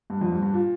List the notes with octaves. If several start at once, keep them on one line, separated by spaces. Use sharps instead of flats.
G2
F2
G2
G2
A#2